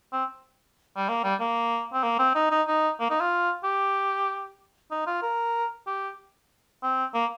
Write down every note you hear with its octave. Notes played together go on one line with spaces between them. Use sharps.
C4
G3
A#3
G3
A#3
C4
A#3
C4
D#4
D#4
D#4
A#3
D#4
F4
G4
D#4
F4
A#4
G4
C4
A#3